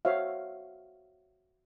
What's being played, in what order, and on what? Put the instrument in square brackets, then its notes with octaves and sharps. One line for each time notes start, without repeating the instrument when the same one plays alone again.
[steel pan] F#4 C5 C#5 E5 F5